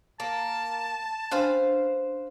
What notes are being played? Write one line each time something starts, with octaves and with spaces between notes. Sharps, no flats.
A#3 A5
C#4 D4 B4 C5 F5